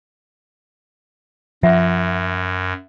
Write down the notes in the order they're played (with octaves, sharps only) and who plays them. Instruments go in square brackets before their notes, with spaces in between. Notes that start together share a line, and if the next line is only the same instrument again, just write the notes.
[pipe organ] F#2 [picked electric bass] F3 [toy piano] E5 F#5